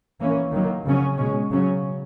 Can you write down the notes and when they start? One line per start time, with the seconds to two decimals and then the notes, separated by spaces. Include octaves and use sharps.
0.20 E3 A#3 C#4
0.53 D#3 F#3 A#3
0.85 C#3 F#3 C#4
1.17 B2 G#3 C#4
1.50 C#3 F#3 C#4